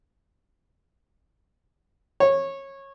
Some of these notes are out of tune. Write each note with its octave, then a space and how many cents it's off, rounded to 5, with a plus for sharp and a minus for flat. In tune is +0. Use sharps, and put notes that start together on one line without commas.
C#5 -20